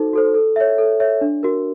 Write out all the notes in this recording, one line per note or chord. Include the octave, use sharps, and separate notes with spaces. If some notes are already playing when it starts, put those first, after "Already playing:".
Already playing: D#4 F#4 A4 C5
F#4 A4 C5
A4
C#5 E5
A4
C#5 E5
D4
F#4 A#4